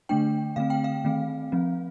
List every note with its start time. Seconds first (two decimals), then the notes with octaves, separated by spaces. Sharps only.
0.09 D3 A3 D4 G5
0.56 D3 A3 C4 F5
0.70 G5
0.84 F5
1.04 D#3 A3 C4
1.52 F3 C4